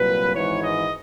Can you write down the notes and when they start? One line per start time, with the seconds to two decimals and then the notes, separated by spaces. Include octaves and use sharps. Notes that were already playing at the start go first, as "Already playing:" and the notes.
Already playing: C2 A#2 F#3 B4
0.34 G#1 G#2 E3 C#5
0.64 D#5